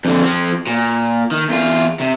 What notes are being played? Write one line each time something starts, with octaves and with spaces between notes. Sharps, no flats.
F2 D3
F3 C4
A#2
D#3
E2 F4
C3